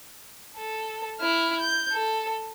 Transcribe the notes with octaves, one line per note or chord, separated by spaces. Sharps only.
A4
E4 F6
G6
A4